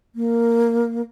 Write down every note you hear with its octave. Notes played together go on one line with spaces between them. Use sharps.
A#3